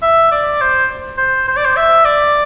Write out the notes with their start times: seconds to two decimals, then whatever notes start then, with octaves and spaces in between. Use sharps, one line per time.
0.02 E5
0.31 D5
0.61 C5
1.18 C5
1.48 C5
1.56 D5
1.65 C5
1.76 E5
2.05 D5